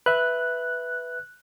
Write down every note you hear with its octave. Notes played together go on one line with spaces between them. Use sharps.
B4 E5 F#6